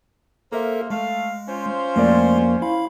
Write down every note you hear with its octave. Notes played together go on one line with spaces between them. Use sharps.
A#3 A4 A#4 C5 E5
G#3 A3 F5
C#4 F4 C5
F2 A3 A#3 D5
E4 F5 B5